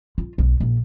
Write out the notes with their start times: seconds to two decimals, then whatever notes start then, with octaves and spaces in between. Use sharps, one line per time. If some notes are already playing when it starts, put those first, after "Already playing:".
0.18 F4
0.38 B1
0.60 A#1